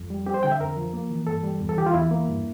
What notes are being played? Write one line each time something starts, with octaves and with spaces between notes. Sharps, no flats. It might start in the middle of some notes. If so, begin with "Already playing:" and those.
Already playing: F2
G3
C4 G4
C5
D3 G5
E5
F2 A#4
F3
A#3
E3
G2 A4
G3
E2
A4
E3 G4
F4
E2 E4
A#3
G2